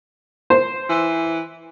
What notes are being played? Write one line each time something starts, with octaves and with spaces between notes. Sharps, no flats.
C5
E3